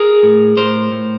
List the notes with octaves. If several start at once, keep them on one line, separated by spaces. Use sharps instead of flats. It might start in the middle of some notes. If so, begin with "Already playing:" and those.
Already playing: G#4 A#4
A2
A2 A#4 C5
A2